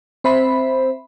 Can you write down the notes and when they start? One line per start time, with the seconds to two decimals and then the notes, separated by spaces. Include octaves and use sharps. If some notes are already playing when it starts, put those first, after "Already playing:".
0.24 C4 C5 E5 B5